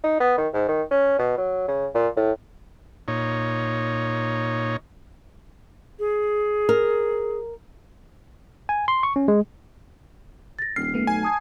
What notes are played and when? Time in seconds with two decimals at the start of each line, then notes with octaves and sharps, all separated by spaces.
0.04 D#4
0.20 B3
0.38 D#3
0.54 G#2
0.68 D#3
0.91 C#4
1.19 B2
1.38 F#3
1.68 C#3
1.94 A#2
2.16 A2
3.08 A#2 D#4 C#5
5.99 G#4
6.69 A#4
8.69 G#5
8.88 C6
9.03 C#6
9.16 C#4
9.28 G#3
10.59 A6 A#6
10.76 D#1 F6 C7
10.94 A3 B3
11.07 B1 G#5
11.23 A5 D#6 G#6